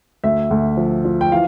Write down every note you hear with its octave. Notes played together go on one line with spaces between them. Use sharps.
D2 E5
D2
F3
F3
G5
E3 F5